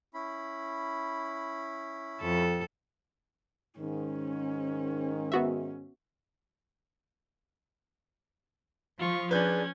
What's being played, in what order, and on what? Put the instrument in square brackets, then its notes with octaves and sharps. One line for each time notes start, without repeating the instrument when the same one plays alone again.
[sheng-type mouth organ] C#4 E4 B5
[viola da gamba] F2 A4
[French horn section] G#2 D#3 [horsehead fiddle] C#4
[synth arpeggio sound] B3 F#4 E5
[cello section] F3 [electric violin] F4 C#6
[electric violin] C#4 G#6 [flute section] D4 G#4 D5 [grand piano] B4 G6